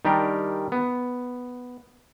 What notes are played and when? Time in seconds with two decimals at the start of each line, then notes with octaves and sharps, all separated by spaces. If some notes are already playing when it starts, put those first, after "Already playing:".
0.05 D#3 G3 D4 G4 A#4
0.72 B3